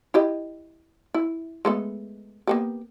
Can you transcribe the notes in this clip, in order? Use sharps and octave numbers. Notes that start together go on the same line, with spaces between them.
E4 G4 D#5
E4
G#3 A3 B3
A#3 B3 G4